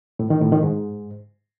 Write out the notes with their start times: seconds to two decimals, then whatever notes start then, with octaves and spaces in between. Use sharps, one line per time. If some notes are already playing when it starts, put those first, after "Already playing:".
0.19 A2
0.30 D#3
0.41 A2
0.52 D#3
0.63 G#2